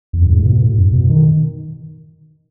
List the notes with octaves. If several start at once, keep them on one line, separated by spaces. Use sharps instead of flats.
E2
F#2
G#2
A2
B2
A2
F#2
B2
D#3